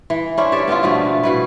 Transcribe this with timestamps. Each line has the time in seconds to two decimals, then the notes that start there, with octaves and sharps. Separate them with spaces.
0.10 E3
0.37 C#4 D4 E4 C5
0.52 G4 A4 C#5 E5
0.68 B3 C#4 E4 F4
0.83 B2 D3 F3 A3
1.23 B2 E4 B4